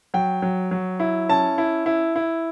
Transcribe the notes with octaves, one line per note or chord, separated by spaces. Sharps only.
F#3 G5
F#3
F#3
E4
C#4 A5
E4
E4
E4